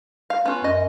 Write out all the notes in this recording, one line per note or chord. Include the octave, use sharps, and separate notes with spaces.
F5
B3 C#4 F4
F#2 D#5